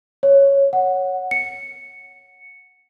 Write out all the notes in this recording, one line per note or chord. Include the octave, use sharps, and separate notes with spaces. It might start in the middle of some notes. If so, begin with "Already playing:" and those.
C#5
F#5
C#7